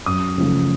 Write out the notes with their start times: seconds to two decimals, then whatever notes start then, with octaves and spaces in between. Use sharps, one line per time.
0.06 F#2 D#6
0.38 C#3 F3 A3